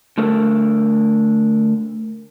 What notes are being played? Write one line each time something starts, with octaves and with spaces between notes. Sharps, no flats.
D3 A3 A4 A#4